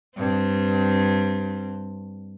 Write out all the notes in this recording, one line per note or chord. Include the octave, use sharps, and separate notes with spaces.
G2 C4